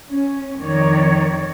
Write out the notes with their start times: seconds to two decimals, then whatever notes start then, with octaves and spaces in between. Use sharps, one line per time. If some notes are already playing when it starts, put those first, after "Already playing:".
0.11 C#4
0.60 F2 D#3 C#5 D5